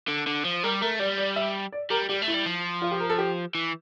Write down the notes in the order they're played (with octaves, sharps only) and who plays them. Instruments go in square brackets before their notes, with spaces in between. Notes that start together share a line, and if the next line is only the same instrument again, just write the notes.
[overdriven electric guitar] D3
D3
F3
[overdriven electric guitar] G3 [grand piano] A#4
[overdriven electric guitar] A3 [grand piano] A#4
[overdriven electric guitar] G3 [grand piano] D5
[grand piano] D5
E5
D5
[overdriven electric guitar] G3 [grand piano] A#4
[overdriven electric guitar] G3 [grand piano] G4
[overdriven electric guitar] A3
[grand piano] E4
[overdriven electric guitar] G3
F3
[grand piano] F4
G4
A#4
A4
G4
[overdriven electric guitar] E3